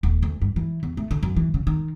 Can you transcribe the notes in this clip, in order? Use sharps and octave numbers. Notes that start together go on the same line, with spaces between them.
D#1
D2
G2
E3
E2
A3
D3
F#2
E3
C#3
D#3